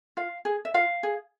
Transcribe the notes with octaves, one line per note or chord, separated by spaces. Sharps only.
F4 F5
G#4
E5
F4 F5
G#4